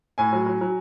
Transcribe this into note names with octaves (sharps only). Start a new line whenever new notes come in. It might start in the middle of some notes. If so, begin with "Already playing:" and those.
A2 G#5
F#3
F#3
F#3